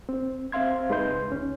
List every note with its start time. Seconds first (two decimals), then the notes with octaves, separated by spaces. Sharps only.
0.09 C4
0.52 C4 C5 E5 F5 C6 G#6
0.89 C#2 G#3 D#4 B4 C6 G6
1.28 D2 C#4